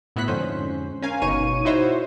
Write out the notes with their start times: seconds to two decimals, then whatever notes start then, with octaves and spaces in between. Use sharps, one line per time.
0.16 A2 B3 E4 F#4 F#6 B6
0.28 F2 G#2 D3 C#4 C5
1.02 C#4 A#4 F5 G#5
1.22 G1 B2 D#4 C#5 C#6 D#7
1.65 D#4 E4 F#4 C5 C#5 E5